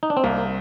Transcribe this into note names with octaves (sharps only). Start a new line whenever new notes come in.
D#4
D4
C4
C2 A#3